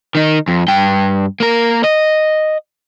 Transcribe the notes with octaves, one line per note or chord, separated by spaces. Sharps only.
D#3 D#4
F2
G2 G5
A#3 A#4
D#5